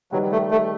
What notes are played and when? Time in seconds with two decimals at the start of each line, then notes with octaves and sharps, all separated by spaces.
0.12 D#3 F#3 G3 D#4 G4 B4
0.32 A3
0.51 A3